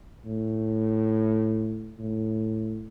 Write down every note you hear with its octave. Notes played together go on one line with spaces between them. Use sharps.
A2
A2